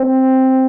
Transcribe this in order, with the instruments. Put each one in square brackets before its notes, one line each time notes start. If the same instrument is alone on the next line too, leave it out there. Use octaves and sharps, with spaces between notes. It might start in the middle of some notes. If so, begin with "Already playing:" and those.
Already playing: [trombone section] C4